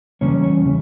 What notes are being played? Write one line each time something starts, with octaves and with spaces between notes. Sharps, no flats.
E2 C#3 G3 A#3 C#4 C#5
C#5
C#3 E3